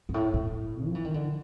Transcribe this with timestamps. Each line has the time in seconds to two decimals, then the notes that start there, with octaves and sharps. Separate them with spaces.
0.09 G#2
0.14 A2
0.34 A2
0.85 F3
0.95 E3
1.05 D#3
1.14 D3